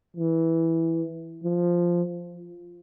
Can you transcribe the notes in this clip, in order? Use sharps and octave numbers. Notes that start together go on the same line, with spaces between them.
E3
F3